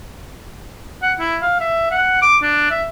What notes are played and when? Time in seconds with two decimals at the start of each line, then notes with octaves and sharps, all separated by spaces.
1.02 F#5
1.19 E4
1.42 F5
1.60 E5
1.91 F#5
2.22 D6
2.42 D4
2.70 E5